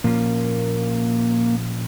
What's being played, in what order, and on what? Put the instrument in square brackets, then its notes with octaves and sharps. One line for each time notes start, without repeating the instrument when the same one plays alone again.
[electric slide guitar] A#2 F3 C#4 F4 [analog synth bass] A#3